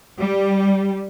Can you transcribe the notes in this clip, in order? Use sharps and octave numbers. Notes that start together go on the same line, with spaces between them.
G3